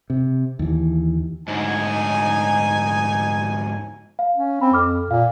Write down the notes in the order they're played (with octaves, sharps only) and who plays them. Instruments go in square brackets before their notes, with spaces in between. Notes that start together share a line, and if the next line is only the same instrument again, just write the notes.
[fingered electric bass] C3
D#2 E3
[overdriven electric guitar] D2 G#2 [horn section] D#4 G#5
[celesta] F5
[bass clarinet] C#4
[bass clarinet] C4 [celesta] B5
[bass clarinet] F2 [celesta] D6 F6
[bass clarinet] A#2 [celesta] F5